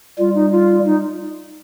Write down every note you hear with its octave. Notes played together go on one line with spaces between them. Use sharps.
G3 F4
D#4
F4
D#4